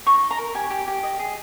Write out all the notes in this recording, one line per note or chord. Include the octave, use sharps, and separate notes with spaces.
D#4 C#6
D#4
A#5
A#4
G4 G#5
G4
G4
D#5
G#4